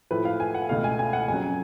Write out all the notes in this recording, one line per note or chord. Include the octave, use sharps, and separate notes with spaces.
A2 F3 A3 B4
F5
G#5
F#5
C#2 B2 A3 F5
G#5
G#5
F#5
F2 C#3 F#3 G#5